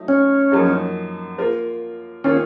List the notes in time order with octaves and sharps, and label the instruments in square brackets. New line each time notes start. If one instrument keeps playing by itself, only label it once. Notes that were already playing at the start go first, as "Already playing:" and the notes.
Already playing: [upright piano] F#3 A3 D#4
[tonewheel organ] C#4
[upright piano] F#2 F3 A#3 D#4 A4
A#3 F4 A#4
[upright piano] D#3 A#3 F4 [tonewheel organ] C#4